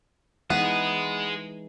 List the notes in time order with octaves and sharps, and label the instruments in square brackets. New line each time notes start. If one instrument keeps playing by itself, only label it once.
[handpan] E3 G#3 D#4 [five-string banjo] B3 [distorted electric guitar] G#4 D#5